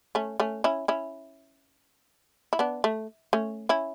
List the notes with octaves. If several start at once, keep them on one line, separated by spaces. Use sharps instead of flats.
A3 C#4
A3 C#4
C#4 E4
C#4 E4
E4
B3 D4
A3
A3 C#4
C#4 E4